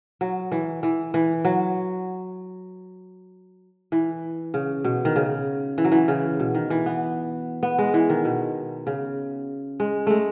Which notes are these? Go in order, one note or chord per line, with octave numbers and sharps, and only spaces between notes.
F#3
E3
E3
E3
F#3
E3
C#3
B2
D#3
C#3
E3
F#3
E3
C#3
B2
D#3
E3
B3
B3
G#3
E3
D#3
B2
C#3
G#3
G#3 A3